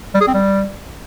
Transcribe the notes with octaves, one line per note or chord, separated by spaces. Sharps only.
G3
G#4
C4
G3